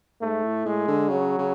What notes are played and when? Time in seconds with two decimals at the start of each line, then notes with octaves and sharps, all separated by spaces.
0.21 G#2 A3
0.44 A2
0.66 A2 G#3
0.88 D3
1.09 C#3 F#3
1.39 C#3